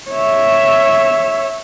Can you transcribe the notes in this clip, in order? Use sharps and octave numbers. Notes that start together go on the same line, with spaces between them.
C#5 E5